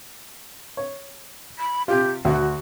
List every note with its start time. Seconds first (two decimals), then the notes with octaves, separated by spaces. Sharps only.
0.77 C#5
1.59 B5
1.88 C3 F4 G4
2.25 D2 F#4